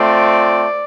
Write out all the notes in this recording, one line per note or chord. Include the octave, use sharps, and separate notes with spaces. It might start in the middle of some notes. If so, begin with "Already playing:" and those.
Already playing: A3 C4 F4 D5